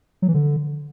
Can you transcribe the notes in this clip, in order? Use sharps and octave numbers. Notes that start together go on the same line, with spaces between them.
F#3
E3
D3